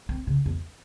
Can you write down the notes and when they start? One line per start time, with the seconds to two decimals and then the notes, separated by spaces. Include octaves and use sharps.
0.09 C4
0.27 C#3
0.46 E2